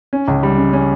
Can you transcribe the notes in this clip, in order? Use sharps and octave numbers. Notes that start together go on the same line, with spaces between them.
C#4
C#2
G3
C#3
C#4